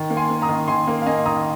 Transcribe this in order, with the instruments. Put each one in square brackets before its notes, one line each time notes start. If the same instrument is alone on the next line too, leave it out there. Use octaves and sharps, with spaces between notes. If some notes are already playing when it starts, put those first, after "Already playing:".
Already playing: [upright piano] D#3
A#3
G#5 C6
A#3
A#5 D#6
D#3
D#3 G#5 C6
A#3
F5
A#3 D#5 G#5
D#3 A#5 D#6